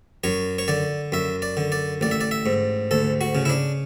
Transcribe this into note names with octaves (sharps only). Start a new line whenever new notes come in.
F#2 C#5
C#5
D3 D5
F#2 E5
D5
D3
D5
A1 D5
E5
D5
E5
G#2
D2 A4
F#4
C#3
E4
D4